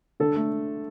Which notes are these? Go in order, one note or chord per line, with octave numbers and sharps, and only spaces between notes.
D3 A4
A3